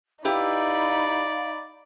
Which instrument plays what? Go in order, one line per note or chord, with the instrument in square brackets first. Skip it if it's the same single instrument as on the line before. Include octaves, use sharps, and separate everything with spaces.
[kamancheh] D#4 B5 [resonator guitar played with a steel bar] E4 G4 B4 [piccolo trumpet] D5 [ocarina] F5